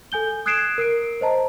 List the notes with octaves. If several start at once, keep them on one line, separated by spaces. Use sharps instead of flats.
A4 G#5 G6 G7
D#6 F#6 G#6 C7 D7 E7
A#4 C7 D7
C5 D#5 A5 A#5